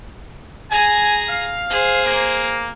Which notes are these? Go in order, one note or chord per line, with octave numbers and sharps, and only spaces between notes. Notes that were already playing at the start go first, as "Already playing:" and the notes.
G#4 G#5 A#5
F5
G#4 C5
A#3